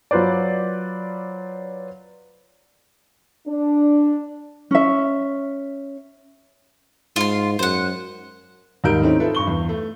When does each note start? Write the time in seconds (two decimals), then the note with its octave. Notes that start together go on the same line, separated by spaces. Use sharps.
0.11 F#3 F4 B4 C5 D5
3.48 D4
4.71 C#4 E5
7.16 G#2 F4 C6
7.59 F#2 C5 F#5
8.84 D#2 G#2 G3 A#4 G6 D7
9.02 D#3 A3 C4 C#4 D#4 E4
9.20 F4 A4 B4 E5
9.35 G2 C#6 G7
9.47 E2
9.69 A3